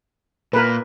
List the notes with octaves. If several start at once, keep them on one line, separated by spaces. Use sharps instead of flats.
A#2 A#4 B4